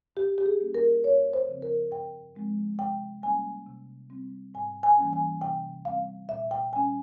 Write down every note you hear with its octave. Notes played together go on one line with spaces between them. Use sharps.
G2 G4
G4
G#4
G3 A#3 C#4
A#4
F2 C#5
C5
C#3 F3 C4
A#4
G2 G5
F3 G#3 C4
C3 G5
G3 A#3 C#4 G#5
C3
G3 C4
G#2 G#5
G#5
E3 G3 A#3 C#4
G#5
C3 G5
G3 C4 F5
A#2 E5
G5
G3 C#4 G#5